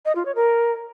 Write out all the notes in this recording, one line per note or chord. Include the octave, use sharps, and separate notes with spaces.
D#5
F4
C#5
A#4